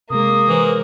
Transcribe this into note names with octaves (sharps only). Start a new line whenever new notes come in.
C3 G#3 A#3 D#6
E3 A#4 C5